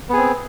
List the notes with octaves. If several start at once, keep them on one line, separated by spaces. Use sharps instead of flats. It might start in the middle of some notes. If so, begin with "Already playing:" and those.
B3 C4 G#4